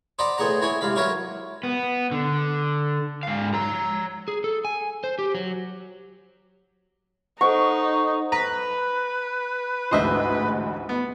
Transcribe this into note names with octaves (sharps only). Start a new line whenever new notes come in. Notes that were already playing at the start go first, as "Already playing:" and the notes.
C5 D5 D#5 F#5 A#5 B5
A2 B3 G#4 F#5 A#5
C4 E4 C#5 G#5
G#2 C3 F5 B5
F#3 E4 A#4 B4 C#5 F5
B3
D3
G#2 F5
C#5 A#5
G#4
A4
G#5
C5
G4
F#3
D#4 A4 C5 F#5 C#6
B4 A#5
A1 D2 G#2 C5 D#5 E5
B3